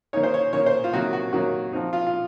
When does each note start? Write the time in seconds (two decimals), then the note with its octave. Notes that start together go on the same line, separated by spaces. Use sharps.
0.13 D#3 A#3 D#4 C#5
0.23 C5
0.34 C#5
0.53 D#3 A#3 D#4 C#5
0.66 C5
0.84 F4
0.93 C3 D#3 F#3 A#3 D#4 F#4
1.13 F#4
1.33 C3 D#3 F#3 A#3 D#4 F#4
1.73 F3 C4 D#4
1.93 F4
2.07 F4